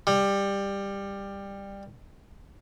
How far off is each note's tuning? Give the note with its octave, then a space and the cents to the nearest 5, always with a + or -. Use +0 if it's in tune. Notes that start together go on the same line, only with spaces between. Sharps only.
G3 +15